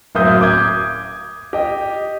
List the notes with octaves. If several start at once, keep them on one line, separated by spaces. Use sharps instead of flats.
D1 F#2 A#3 E5 D#6 G6
D6 D#6 G6 G#6
G4 D#5